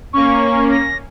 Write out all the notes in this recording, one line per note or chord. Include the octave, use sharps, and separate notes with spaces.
A#3 C#4 C#6
A#6